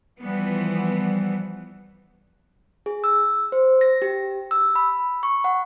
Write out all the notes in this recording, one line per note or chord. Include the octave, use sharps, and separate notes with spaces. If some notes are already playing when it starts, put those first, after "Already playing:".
E3 F3 G3 B3
G#4
E6
C5
A#6
G4
E6
B5
C#6
F#5